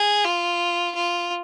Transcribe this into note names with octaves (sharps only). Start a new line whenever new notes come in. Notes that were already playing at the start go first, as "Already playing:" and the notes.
Already playing: G#4
F4
F4